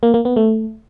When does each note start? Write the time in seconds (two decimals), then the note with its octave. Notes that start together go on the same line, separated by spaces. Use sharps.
0.03 A#3
0.14 A#3
0.25 B3
0.36 A3